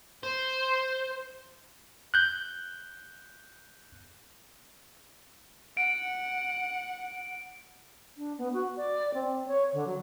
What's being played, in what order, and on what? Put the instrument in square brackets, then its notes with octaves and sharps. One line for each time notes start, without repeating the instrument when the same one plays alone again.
[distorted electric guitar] C5
[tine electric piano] F#6 G6
[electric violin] F#5 [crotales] D7
[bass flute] D4
B3
F#4
D5
C4
C#5
D3
F#3